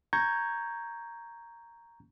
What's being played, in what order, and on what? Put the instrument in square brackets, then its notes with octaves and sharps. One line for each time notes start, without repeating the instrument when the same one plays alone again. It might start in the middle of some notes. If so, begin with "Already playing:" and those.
[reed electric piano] A#5 C#6 G6 G#6